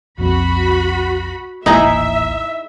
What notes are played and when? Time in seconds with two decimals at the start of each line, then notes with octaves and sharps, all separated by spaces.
0.18 B1 F2 C4 F#4 B5
1.66 D#1 A1 G#3 A#3 D#4 E4 E5 A#5